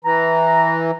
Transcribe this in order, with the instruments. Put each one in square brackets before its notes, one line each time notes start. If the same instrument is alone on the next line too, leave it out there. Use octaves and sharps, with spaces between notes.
[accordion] E3 [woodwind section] A#5